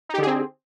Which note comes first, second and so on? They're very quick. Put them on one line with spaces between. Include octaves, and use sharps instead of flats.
D#4 G4 D3 G#4 C4